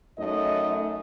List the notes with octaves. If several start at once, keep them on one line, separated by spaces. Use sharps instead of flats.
F#2 A3 D#4 D#5